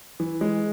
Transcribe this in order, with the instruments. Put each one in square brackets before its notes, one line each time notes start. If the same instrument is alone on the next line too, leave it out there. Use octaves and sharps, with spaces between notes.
[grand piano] E3
G#3